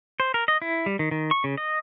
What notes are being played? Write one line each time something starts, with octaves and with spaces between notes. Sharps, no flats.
C5
A#4
D#5
E4
G3
D#3
D#3
C#6
C#3
D#5